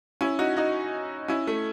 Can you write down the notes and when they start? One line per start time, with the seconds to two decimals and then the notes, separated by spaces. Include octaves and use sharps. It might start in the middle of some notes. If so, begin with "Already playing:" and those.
0.21 C#4 E4
0.39 D#4 F#4
0.56 D#4 F#4
1.28 C#4 E4
1.47 A3